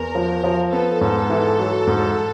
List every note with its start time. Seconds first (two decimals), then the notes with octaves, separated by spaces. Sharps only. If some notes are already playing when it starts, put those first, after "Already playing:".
Already playing: E2 A#4
0.15 F3
0.44 F3
0.72 B3 A4
1.01 G#2
1.30 E3
1.59 F#3
1.87 G#2